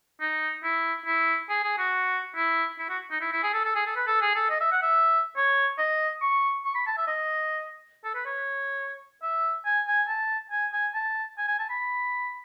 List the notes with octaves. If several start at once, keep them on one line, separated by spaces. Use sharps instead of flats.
D#4
E4
E4
G#4
G#4
F#4
E4
E4
F#4
D#4
E4
E4
G#4
A4
A4
G#4
A4
B4
A4
G#4
A4
D#5
E5
F#5
E5
C#5
D#5
C#6
C#6
B5
A5
E5
D#5
A4
B4
C#5
E5
G#5
G#5
A5
G#5
G#5
A5
G#5
G#5
A5
B5